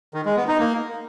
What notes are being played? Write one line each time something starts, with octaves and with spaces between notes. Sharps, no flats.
D#3
G#3
B3
D#4
A#3